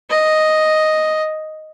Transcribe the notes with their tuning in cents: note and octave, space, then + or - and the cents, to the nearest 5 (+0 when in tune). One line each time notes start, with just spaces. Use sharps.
D#5 +0